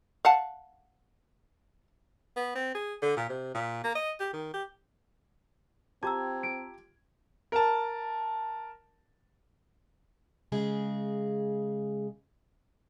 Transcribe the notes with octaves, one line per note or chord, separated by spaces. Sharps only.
F5 F#5 A5
B3
C4
G#4
D3
A#2
C3
A#2
A#3
D#5
G4
D#3
G4
C4 F4 G4 A5 A#5 E6 G#6
D7
A#4 A5
C#3 G#3 G#4